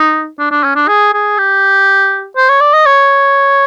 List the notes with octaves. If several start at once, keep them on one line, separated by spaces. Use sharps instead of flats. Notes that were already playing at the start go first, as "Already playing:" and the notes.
Already playing: D#4
D4
D4
C#4
D4
G#4
G#4
G4
C5
C#5
D5
D#5
C#5